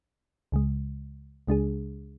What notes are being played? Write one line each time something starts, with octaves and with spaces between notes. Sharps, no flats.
C#2 C#3 G#3
C#2 C#3 G#3 D4 G#4